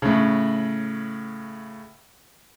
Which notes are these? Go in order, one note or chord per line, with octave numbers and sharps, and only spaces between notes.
A2 C#3